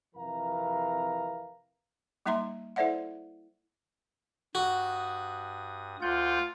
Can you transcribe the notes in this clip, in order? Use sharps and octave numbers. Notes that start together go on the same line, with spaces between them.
F2 C3 E3 A#4 F5 A#5
G3 A#3 D#4 E5 A#5 C6
E4 A4 C5 D5 E5 F#5
G2 F#4 D#6
D2 F4 F#5 G6